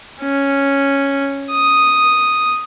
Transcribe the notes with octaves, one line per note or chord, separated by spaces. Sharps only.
C#4
D#6